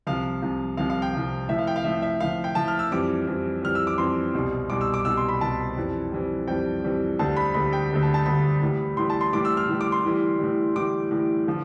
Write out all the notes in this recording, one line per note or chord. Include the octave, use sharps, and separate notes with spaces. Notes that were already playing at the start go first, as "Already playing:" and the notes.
C2 C3 F3 F5
C2 C3 F3
C2 C3 F3 F5
F5
G5
C2 C3 F3
A2 F3 E5
F5
G5
F5
A2 F3 E5
E5
A2 F3 F5
G5
A2 F3 A5
F6
E6
F2 E3 G3 D6
F2 E3 G3
F2 E3 G3 F6
E6
D6
F2 E3 G3 C6
C2 B2 G3
C2 B2 G3 D6
E6
D6
C2 B2 G3 E6
C6
B5
C2 B2 G3 A5
F2 E3 G3
F2 E3 G3
F2 E3 G3 G5
F2 E3 G3
D2 D3 G3 A5
B5
D2 D3 G3 B5
G5
D2 D3 G3
A5
A5
D2 D3 G3 B5
A2 E3 G3
A2 E3 G3 C6
A5
C6
A2 E3 G3 D6
E6
F6
A2 E3 G3
D6
C6
A2 E3 G3
A2 E3 G3
A2 E3 G3 D6
A2 E3 G3
D3 F3